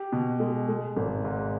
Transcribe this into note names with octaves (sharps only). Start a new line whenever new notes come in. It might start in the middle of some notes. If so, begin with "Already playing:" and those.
Already playing: G4
B2
G#3
G#3
G#1
G#2